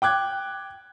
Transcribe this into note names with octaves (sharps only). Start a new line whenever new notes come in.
G5 D6 F#6 G#6